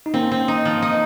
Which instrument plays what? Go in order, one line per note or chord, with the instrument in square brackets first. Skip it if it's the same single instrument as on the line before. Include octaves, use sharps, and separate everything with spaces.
[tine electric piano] D#4
[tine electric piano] A#3 C#4 [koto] C4
[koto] C4
D#4
F3
D#4